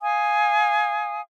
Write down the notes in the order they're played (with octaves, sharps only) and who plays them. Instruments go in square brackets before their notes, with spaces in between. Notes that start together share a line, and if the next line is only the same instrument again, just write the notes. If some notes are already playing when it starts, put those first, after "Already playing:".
[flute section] F5 G#5 D#6